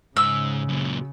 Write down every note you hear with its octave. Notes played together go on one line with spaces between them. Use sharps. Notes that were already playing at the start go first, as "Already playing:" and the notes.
G#2 C#3 E6
F#2 A#2